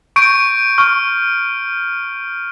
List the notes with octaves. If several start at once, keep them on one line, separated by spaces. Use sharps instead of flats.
C#6 G6 D7
C#6 F6